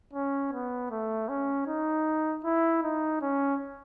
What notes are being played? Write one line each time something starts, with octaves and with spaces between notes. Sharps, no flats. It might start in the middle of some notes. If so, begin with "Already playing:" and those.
C#4
B3
A3
C#4
D#4
E4
D#4
C#4